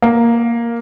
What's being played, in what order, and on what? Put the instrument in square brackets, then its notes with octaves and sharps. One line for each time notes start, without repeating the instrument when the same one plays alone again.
[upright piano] A#3